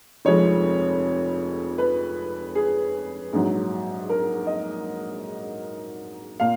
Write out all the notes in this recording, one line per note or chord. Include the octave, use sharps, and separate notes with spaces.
F1 F2 F3 G#3 C#5
B4
G#4
A#1 G#2 F#3
A#4
D#5
A#2 F5